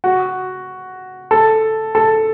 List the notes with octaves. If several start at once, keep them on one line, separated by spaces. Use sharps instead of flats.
F#4
A4
A4